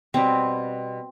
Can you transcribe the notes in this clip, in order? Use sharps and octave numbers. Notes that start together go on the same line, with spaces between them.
B2 G3 B3 C4